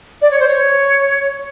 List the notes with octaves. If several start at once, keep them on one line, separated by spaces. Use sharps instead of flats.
D5
C#5
C5
C#5